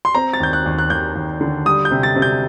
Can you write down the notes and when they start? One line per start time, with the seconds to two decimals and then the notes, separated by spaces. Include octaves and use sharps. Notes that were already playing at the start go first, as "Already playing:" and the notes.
0.05 C6
0.15 C4 A#5
0.33 A6
0.40 D#2 G6
0.53 F#6
0.66 D#2
0.78 F#6
0.90 D#2 G6
1.15 D#2
1.41 D3
1.66 G3 D#6
1.85 G6
1.91 C3
2.03 A6
2.16 C3
2.22 G6